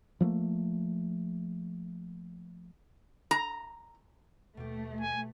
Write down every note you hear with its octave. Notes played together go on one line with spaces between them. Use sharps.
F3 F#3 A3 A#3
A#5
D#2 B2 A3 G4
G#5